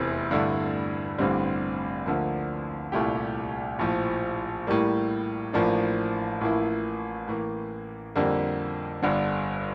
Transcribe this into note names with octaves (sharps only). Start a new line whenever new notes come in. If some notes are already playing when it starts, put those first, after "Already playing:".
Already playing: F1 E2 C3 C4
G2 D3 A3 E4
A1 G2 D3 G3 C4
D2 D3 F3 A#3
C2 A#2 A3 E4 G4
A#1 A2 F3
A2 G3 A#3
A1 A2 F3 A#3 D4
A1 A2 F3 A#3 E4
A2 E3 A#3
F2 D3 G3 A#3
G1 G2 D3